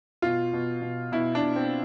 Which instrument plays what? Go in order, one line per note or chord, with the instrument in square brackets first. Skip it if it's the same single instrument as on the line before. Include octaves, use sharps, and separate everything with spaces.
[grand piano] B2 F4
B2
B2
B2 E4
D4
B2
C4